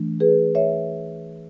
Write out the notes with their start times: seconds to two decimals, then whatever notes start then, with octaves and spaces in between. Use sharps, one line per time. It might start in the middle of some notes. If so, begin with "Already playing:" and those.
Already playing: E3 A3 D4
0.20 G#4 B4
0.55 C#5 E5